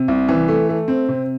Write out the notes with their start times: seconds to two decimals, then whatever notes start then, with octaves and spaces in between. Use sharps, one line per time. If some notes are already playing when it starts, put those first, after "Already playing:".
Already playing: C3
0.08 C2
0.29 E3
0.48 A3
0.69 A3
0.88 C4
1.08 C3